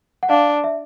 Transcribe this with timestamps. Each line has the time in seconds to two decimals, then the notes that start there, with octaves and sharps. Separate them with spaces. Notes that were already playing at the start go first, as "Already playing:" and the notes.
0.23 F#5
0.29 D4 F5
0.64 E5